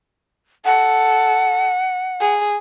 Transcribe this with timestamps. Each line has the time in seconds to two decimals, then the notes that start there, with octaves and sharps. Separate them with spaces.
0.65 A4 F#5
2.20 G#4